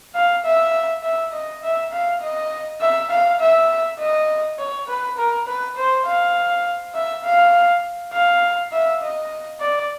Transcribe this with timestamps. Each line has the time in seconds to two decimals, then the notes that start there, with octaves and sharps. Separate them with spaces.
0.15 F5
0.45 E5
1.03 E5
1.33 D#5
1.63 E5
1.93 F5
2.21 D#5
2.81 E5
3.11 F5
3.40 E5
3.99 D#5
4.59 C#5
4.88 B4
5.18 A#4
5.47 B4
5.77 C5
6.05 F5
6.95 E5
7.24 F5
8.13 F5
8.72 E5
9.02 D#5
9.60 D5